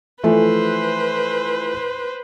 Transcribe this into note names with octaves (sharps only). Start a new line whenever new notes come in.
E3 F3 A3 B4 C5